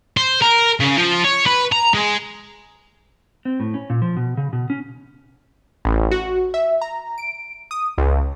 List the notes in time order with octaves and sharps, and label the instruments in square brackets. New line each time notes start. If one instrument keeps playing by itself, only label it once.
[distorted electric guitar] C5
A#4
C#3
F3
C#5
B4
A#5
G#3
[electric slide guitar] C4
A2
C#4
A#2
F3
B2
C#3
B2
C#4
[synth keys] A1
F#4
E5
A#5
D7
D#6
C#2